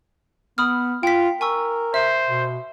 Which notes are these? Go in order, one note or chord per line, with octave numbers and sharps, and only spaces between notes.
B3 B5 D#6 F6
F4 G5 B6
A#4 G#5 C#6 E6
C5 E5
B2